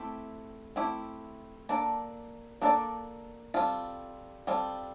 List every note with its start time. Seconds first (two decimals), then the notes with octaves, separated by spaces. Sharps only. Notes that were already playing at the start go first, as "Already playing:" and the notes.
Already playing: A3 C4 E4 G4
0.76 A3 C4 E4 G4
1.69 A#3 D4 A4 D5
2.61 A#3 D4 A4 D5
3.54 G3 C4 F4 A4
4.47 G3 C4 F4 A4